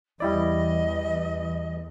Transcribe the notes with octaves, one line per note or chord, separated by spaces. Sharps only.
E2 E3 G3 E4 D5 D#5